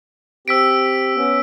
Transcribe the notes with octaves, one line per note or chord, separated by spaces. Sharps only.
C4 G4 E6 B6 D7
B3 C#4